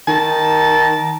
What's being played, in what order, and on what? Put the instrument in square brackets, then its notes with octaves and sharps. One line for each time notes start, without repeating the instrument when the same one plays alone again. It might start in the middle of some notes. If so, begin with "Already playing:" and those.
[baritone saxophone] D#3 [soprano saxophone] A5